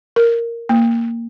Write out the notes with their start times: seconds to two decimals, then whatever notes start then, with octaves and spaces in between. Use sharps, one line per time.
0.16 A#4
0.69 A#3